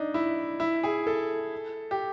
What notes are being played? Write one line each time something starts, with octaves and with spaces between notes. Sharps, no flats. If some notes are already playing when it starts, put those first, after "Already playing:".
Already playing: D4 D#4
E4
E4
G#4
A4
G4